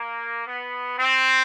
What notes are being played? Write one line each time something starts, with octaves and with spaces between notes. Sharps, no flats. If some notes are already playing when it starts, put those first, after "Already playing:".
Already playing: A#3
B3
C4